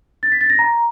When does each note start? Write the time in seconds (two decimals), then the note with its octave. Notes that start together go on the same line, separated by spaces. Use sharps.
0.23 A6
0.32 B6
0.41 A6
0.50 A#6
0.59 A#5